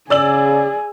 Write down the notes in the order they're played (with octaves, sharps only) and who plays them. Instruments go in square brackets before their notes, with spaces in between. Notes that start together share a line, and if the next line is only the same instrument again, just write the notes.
[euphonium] C#3 [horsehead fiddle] G#4 [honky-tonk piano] D5 E6 F#7